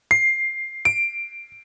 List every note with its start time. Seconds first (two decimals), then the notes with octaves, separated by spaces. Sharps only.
0.11 C7
0.85 D7